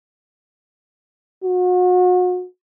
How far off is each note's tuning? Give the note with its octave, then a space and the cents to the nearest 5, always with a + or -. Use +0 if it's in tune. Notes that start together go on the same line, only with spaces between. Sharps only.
F#4 -35